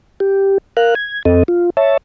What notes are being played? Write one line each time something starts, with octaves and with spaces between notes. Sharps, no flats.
G4
A#4 F5 F#6
G#6
F2 C4 A4 D#5
F4
C#5 E5 A5